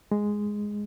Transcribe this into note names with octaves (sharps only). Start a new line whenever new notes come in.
G#3